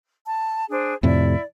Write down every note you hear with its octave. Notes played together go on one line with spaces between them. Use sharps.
A5
D4 G#4 C5
F2 A2 C3 E4 D5